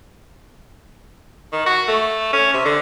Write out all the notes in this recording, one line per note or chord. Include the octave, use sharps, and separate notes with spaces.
D#3
F#4
A3
C#4
C3
D3